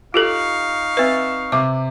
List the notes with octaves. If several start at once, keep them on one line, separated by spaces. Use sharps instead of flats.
D#4 F4 G4 A4 F5 C#6
C4 B4 E5 E6
C3 D6